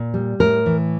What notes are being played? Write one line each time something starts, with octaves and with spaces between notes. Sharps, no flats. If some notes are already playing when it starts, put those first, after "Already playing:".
Already playing: A#2
G3
A2 A#4
E3